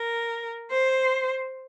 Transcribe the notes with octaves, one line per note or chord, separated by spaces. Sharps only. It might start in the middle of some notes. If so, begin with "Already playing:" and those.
Already playing: A#4
C5